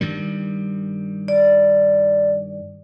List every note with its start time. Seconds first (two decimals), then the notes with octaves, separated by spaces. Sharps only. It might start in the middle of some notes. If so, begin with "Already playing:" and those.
0.01 G2 D#3 G3
1.28 D5